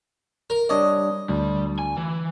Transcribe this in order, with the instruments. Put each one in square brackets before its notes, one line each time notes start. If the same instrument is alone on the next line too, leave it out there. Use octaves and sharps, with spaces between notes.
[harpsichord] A#4
[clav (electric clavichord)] G3 D4 C#5 [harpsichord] D#5
[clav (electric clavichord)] D2 [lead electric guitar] G3
[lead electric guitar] G#5
E3